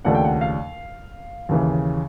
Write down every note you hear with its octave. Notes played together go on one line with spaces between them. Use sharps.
D#2 C#3 F3 A3 D4 F#5
G5
F#5
F5
D#2 C#3 E3